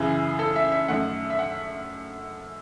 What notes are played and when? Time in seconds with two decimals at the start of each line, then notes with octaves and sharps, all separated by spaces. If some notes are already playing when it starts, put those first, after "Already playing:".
Already playing: F#2 C#3 E3 G#4
0.39 A4
0.56 E5
0.72 E5
0.88 F#2 D#3 A3 F#5
1.30 E5
1.39 F#5